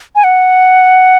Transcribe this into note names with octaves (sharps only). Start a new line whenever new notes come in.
G#5
F#5